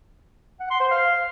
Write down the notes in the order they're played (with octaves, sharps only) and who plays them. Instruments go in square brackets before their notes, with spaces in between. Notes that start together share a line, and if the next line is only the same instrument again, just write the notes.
[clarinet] F#5
C6
C5
F5